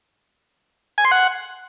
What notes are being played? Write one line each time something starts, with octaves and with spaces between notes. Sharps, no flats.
G#5
C6
F#5